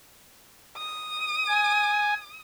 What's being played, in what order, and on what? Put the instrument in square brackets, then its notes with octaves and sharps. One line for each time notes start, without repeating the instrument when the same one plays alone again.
[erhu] D#6
[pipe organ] G#5